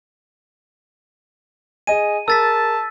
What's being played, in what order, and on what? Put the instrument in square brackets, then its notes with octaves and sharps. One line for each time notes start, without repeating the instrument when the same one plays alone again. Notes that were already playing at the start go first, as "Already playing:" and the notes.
[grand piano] G#4 D#5 G#5 [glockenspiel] D#7
[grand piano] G#4 A#4 [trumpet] A5 [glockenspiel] E6 A6 B6